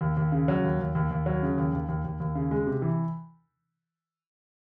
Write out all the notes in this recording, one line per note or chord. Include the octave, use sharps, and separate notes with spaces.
D#2
D#2
C#3
F#3
D#2
D#2
D#2
D#2
F#3
C#3
D#2
D#2
D#2
D#2
D#2
C#3
G#3
C3
E3